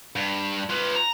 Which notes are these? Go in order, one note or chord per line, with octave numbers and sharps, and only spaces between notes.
G2
F4 B4
A#5